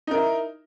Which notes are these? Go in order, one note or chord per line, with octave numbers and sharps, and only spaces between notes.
D#4 E4 A#4